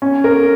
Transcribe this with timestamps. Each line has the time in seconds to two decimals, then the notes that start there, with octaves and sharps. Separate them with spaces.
0.02 C#4
0.24 A#4